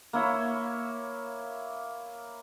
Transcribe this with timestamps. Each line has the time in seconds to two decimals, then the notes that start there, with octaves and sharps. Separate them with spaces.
0.13 A#3 E4 C#5